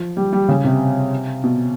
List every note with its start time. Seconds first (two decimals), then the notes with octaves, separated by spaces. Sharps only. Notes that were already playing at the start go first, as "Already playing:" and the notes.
Already playing: F3
0.17 G3
0.33 G3
0.49 C#3
0.64 C3
1.44 B2